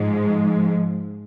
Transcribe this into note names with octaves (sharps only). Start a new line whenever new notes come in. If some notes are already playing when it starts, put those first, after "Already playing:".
Already playing: G#2 F3 G#3